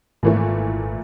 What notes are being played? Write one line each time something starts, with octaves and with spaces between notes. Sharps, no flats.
G#1 A#2 E3 A3